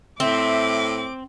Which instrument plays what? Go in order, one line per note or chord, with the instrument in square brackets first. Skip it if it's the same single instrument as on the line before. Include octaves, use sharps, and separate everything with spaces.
[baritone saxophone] A2 [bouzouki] C4 [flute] E5 [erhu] D6